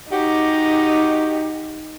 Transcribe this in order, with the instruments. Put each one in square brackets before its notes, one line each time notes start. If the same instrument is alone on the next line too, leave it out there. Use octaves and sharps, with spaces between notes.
[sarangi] D#4 [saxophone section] F#4 G4